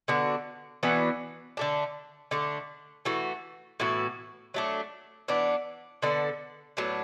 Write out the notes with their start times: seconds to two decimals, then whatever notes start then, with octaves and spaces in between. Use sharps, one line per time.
0.08 D3 B3 D4 F#4
0.83 E3 B3 D4 F#4
1.57 D3 A3 D4
2.31 D3 A3 D4
3.05 E3 A3 F#4
3.80 A2 E3 B3 F#4
4.54 F#3 A3 D4
5.28 E3 B3 D4
6.02 D3 B3 D4 A4
6.77 A2 F#3 B3 D4